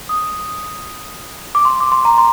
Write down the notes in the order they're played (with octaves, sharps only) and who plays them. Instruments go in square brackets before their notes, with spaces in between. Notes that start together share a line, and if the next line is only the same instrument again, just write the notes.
[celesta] D#6
D6
C6
D6
C6
A#5
C6